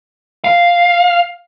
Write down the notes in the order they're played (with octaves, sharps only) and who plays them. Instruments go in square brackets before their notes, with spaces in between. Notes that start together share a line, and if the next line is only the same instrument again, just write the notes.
[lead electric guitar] F5